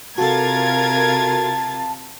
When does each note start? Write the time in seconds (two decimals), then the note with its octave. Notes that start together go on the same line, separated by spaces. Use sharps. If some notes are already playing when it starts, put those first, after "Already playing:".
0.18 C3 F4 F#4 A4 A#4 A5 G#6 A6